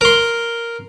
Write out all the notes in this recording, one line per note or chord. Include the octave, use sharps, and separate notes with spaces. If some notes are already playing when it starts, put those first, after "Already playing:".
A#4 C6